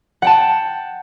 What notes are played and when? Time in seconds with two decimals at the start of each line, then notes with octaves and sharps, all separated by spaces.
0.22 F#5 G5 A5